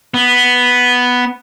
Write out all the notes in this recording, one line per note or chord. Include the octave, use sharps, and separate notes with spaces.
B3